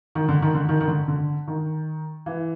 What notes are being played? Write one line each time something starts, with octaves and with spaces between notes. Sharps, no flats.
D#3
D3
D#3
D3
D#3
D#3
D3
D3
D#3
E3